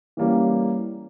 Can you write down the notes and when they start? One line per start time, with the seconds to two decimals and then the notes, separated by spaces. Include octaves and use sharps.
0.17 E3 G3 A#3 C#4